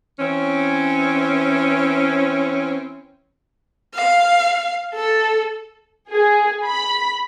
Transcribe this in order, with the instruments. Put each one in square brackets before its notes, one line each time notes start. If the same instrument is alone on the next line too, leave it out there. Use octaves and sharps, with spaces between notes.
[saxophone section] E3 C4 C#4
[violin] F5
A4
[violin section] G#4
B5